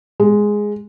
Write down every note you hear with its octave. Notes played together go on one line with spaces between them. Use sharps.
G#3